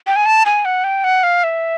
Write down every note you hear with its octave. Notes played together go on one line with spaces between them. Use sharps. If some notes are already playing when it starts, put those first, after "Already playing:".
G5
G#5
A5
G#5
F#5
G5
F#5
F5
E5